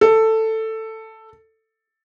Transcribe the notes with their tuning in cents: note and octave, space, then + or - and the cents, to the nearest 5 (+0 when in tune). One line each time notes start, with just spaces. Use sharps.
A4 +10